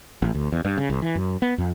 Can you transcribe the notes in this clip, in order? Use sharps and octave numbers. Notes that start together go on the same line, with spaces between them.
A1
D2
E2
G2
C#3
C2
E3
F#2
B3
F2